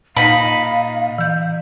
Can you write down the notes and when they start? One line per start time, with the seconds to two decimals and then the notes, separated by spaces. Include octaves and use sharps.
0.16 A#2 D#4 F5 B5
1.18 E3 G6